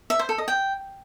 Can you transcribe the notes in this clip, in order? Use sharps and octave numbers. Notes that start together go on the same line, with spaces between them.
E5
C5
A4
D#5
G5